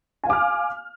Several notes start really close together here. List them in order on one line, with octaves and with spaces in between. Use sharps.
G#5 F5 D6 F6